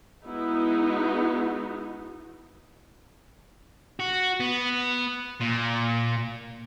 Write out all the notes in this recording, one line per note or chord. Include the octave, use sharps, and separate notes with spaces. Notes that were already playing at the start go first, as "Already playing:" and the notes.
G#3 B3 D#4 E4 F#4
F#4
B3
A#2